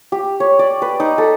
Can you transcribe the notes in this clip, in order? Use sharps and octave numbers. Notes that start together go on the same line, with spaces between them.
G4
C#5
D5
B4
D#4
A4